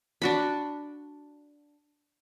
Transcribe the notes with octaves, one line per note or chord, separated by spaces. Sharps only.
D4 F#4 B5